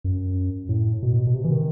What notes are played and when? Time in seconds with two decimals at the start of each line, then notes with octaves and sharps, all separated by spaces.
0.04 F#2
0.69 A2
1.03 B2
1.27 B2
1.34 C3
1.45 E3
1.51 D#3